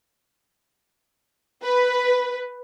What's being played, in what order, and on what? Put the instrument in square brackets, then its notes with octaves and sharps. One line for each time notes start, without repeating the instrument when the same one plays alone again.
[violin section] B4